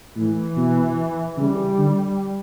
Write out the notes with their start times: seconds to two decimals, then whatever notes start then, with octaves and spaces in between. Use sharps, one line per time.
0.16 A2 E3
0.57 B2
1.37 C#3 G3
1.78 D3